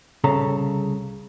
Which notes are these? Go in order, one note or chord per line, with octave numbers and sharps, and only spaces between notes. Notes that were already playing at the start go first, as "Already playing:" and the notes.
C2 C#3 A4 A#5